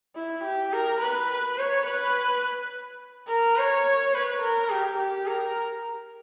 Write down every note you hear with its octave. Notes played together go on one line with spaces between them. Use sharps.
E4
G4
A#4
B4
C#5
B4
A#4
C#5
B4
A#4
G4
G4
A#4